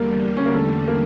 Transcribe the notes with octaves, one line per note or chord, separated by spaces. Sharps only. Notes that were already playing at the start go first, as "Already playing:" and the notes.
Already playing: E2 D3 G3 A#3
C#4
A#3
A3
A#3